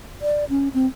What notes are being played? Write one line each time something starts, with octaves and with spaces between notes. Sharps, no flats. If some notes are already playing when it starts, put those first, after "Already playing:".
D5
C#4
C4